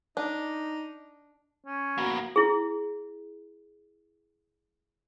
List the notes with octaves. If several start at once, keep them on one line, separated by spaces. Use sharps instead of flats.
D4 D#4
C#4
A#3 B3 F#4
E4 G#4